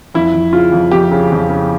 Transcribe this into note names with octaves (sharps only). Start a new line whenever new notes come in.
F2 E4
F2
C#3 F4
F2
F2 G4
C#3
F2
C#3